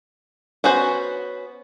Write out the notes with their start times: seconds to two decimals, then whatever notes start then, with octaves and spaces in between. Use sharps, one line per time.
0.64 B3 C#4 F#4 C5